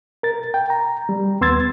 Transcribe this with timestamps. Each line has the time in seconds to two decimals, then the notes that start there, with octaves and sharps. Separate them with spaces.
0.23 A#4 A6
0.54 G5
0.70 A#5
1.09 G3
1.41 D#2 B3 C6 E6 G#6 A6